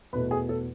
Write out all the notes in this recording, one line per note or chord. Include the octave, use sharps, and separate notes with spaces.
E2 B2 A3 B4
G#4
A4